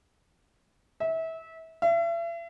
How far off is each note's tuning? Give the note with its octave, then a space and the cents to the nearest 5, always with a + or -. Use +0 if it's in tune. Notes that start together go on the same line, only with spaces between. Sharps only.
E5 -25
E5 +40